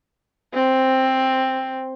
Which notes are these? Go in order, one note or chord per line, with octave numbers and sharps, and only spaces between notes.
C4